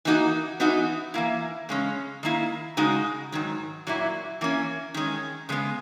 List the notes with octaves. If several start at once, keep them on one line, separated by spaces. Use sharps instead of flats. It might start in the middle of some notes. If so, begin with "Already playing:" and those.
E3 A#3 D#4 F#4
E3 B3 D#4 F#4
E3 A#3 E4
C#3 G#3 C#4
D#3 A#3 E4
C#3 G#3 D#4 F#4
G#2 D#3 F#3
A#2 F#3 A#3 E4
E3 A#3 C#4
D#3 G#3 C#4
C#3 G#3 B3